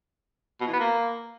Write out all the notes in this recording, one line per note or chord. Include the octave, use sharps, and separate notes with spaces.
B2
E3
B3
A#3